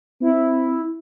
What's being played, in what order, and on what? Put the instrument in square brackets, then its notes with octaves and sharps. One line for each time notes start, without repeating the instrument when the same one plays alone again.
[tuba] C4 [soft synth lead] E4